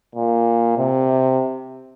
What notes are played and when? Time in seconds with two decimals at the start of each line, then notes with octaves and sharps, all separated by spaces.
0.15 A#2
0.77 C3